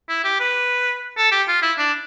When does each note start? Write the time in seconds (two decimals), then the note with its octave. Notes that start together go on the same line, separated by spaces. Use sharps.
0.09 E4
0.24 G4
0.40 B4
1.17 A4
1.32 G4
1.48 F4
1.62 E4
1.78 D4